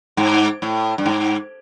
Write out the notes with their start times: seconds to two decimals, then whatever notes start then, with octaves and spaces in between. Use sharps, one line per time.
0.17 G#2
0.62 A2
0.98 G2
1.06 G#2